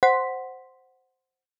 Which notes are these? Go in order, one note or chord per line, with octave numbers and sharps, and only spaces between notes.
C5 F#5 C6 B6